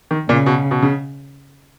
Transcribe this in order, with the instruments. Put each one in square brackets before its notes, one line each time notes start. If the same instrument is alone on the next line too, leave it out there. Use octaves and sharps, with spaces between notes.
[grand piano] D#3
[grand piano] A#2 [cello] C#3
[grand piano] B2
B2
C#3